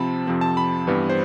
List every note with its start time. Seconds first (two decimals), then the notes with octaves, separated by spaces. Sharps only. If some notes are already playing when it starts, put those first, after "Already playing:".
Already playing: C3 F3 C4 A5 B5
0.27 F2 C3 F3 C4
0.41 A5
0.57 B5
0.87 G2 E3 G3 B3
1.10 C5